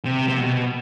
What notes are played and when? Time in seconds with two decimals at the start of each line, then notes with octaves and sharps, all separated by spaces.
0.05 C3
0.28 C3
0.38 B2